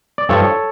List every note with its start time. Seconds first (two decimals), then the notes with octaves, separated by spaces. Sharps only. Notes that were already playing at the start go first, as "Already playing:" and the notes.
0.18 D5
0.29 G2 F3 A4 C#5